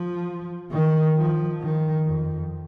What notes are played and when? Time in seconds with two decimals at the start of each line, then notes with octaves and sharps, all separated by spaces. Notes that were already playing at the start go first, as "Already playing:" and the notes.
Already playing: F3
0.71 D#3
1.16 F3
1.61 D#3
2.05 F2